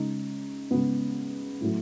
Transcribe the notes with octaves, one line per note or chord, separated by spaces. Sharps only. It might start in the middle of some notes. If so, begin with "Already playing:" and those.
Already playing: C#3 G#3 D#4
C#3 G#3 B3
A2 F#3 A3